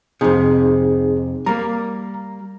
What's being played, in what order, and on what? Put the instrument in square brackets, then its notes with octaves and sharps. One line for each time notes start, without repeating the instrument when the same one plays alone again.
[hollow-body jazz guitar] F2 C3 [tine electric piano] D#4 G#4
[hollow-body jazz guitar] G3 A#3 [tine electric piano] A#5